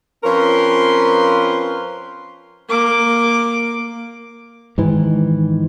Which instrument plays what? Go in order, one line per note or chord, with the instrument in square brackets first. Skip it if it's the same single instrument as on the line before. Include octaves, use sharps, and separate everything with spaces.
[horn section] F3 C4 C#4 A#4 B4 C6
[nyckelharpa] A#3 D6
[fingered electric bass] G#2 D#3 E3